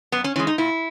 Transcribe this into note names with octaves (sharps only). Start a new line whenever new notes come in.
F#2 B3
C#4
E3 G#3 C#4
D#4
A#2 E4